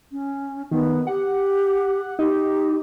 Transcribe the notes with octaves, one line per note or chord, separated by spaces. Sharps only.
C#4
D#3 B3
G4 F#5
D#4 G4